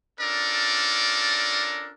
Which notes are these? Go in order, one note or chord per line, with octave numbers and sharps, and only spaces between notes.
C#4 D4 F4 A4 A#4 D5